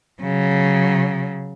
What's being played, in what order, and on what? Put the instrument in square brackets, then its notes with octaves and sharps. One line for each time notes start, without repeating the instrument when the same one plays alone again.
[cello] C#3 F#3